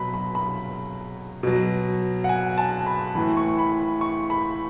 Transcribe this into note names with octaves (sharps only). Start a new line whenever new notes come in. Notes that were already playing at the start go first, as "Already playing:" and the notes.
Already playing: B2 F#3 B5
B5
B5
B2 F#3
F#5
G#5
A5
B5
A2 E3 B5
C#6
B5
C#6
B5